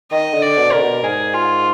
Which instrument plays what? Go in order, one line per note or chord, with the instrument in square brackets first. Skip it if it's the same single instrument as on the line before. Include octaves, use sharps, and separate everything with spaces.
[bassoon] D#3 [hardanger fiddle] D#5
[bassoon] D3
[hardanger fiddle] D5
[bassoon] B2
[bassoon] D3 [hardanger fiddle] A#4
[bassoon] B2
[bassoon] G#2 [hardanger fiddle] G#4
[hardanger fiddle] F4